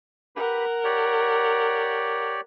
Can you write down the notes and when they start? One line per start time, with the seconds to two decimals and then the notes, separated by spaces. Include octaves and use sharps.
0.36 G4 A#4 B4 F#5 B5
0.84 G4 C#5 D5